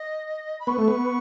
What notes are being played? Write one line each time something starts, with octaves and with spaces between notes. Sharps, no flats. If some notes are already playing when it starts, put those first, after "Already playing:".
Already playing: D#5
B5
B3 C#6
A3
B3